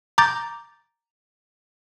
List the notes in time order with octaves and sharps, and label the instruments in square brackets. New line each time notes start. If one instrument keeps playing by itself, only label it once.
[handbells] A#5 D6 G6 A6